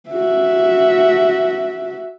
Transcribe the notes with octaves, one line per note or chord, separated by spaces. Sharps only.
F#4 E5